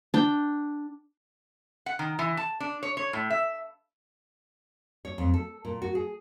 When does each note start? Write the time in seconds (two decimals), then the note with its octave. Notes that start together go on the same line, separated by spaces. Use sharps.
0.14 D4 G5
1.86 F#5
1.99 D#3
2.19 E3
2.37 A5
2.60 D4
2.83 C#5
2.97 C#5
3.13 A2
3.30 E5
5.05 C#5
5.18 F2
5.34 A4
5.65 A#2
5.82 F#4
5.95 G#4